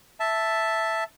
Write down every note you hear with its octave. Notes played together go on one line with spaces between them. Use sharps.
E5 A5